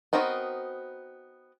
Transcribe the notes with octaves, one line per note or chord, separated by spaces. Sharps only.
B3 C4 D#4 F#4 A#4